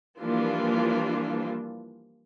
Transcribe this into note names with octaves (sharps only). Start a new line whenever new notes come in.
E3 F3 G3 A#3 D4 F4